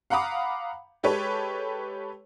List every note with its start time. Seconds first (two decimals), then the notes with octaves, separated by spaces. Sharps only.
0.10 F5 F#5 A#5 B5 D6 D#6
1.03 G#3 G4 A4 B4 C#5